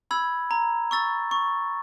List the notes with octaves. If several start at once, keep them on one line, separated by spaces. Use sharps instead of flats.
B5 E6 G#6
A#5
C#6 E6 A6
C#6